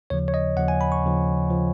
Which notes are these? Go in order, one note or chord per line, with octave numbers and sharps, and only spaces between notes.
D#2 C#3 F3 C#5
C#5
D#5
D#2 C#3 F3 F#5
G#5
B5
C#6
D#2 C#3 F3
C#3 F3